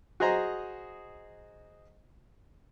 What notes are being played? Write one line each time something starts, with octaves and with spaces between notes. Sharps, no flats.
F#4 G#4 C5 D#5 A#5